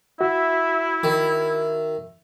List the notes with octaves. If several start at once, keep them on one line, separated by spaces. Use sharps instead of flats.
E4 F#4 E5
D#3 E5